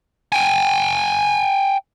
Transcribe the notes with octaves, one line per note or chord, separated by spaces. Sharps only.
G5 G#5